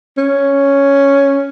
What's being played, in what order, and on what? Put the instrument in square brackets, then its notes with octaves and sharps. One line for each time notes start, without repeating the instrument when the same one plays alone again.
[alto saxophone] C#4